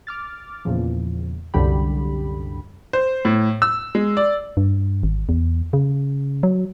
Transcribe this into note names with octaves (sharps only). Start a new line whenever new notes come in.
D6 F6 A6
E2 A#2 C#3 F3
C2 F#2 D3 G3 G4 B5
C5
A2
E6
G#3
D5
G2
G#1
E2
C#3
F#3